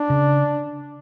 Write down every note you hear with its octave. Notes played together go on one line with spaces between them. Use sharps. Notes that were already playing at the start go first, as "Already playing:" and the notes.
Already playing: D4
C#3